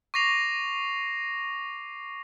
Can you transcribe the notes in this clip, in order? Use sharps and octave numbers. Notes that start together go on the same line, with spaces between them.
C#6 D6 A#6 C7 F7